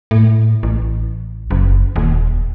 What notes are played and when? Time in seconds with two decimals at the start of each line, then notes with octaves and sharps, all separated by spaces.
0.11 A2
0.63 A1
1.51 F#1
1.96 D#1